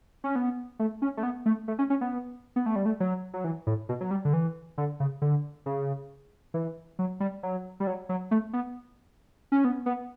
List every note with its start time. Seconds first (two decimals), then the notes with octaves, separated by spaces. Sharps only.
0.24 C#4
0.36 B3
0.79 A3
1.02 C#4
1.17 A3
1.23 B3
1.46 A3
1.68 A3
1.79 C#4
1.90 C#4
2.01 B3
2.56 B3
2.66 A3
2.76 G3
2.86 A3
3.00 F#3
3.34 F#3
3.44 E3
3.67 A2
3.89 B2
4.01 F#3
4.11 G3
4.25 D3
4.33 E3
4.78 D3
5.00 C#3
5.22 D3
5.66 C#3
6.54 E3
6.99 F#3
7.20 G3
7.43 F#3
7.80 G3
7.87 F#3
8.09 F#3
8.31 A3
8.53 B3
9.52 C#4
9.65 B3
9.86 B3